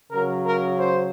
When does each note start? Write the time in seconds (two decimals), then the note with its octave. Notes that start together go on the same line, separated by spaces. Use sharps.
0.11 C#3 F#3 A#4
0.44 A#4
0.78 C5